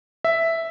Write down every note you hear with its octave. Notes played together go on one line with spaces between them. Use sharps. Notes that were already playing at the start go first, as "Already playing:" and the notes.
E5